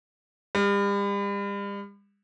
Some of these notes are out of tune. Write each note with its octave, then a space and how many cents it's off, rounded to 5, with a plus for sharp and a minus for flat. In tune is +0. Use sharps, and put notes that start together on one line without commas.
G3 +40